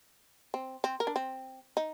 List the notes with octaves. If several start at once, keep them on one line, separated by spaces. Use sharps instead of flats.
C4
C4
A#4
D4
C4
D#4